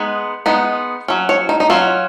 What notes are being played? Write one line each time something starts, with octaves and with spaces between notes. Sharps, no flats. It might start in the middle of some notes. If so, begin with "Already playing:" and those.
Already playing: G#3 B3 D#4
G#3 B3 D#4
F#3 C#4
C#5
D#4
D#4
F#3 C#4 F4